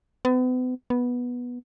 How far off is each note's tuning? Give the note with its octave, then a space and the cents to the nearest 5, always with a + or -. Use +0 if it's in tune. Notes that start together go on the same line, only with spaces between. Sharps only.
B3 +40
B3 -10